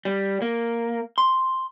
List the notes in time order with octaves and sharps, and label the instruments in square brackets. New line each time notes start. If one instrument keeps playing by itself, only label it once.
[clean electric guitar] G3
A#3
C6